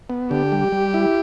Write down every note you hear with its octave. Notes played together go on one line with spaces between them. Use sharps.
B3
D3 G4
G3
G3
E4